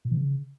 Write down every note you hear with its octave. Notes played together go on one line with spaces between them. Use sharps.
A#2
E3
C#3